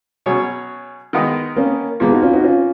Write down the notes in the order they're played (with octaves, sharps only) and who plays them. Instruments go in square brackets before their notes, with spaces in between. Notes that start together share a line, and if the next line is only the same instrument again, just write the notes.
[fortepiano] B2 F#3 C#4 G#4 C#5
D#3 G#3 B3 D#4
[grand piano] A#3 C#4
[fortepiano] A#2 F3 A#3 [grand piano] G#3 B3
[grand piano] D#4 F#4
C#4 F4
D#4 F#4
C#4 F4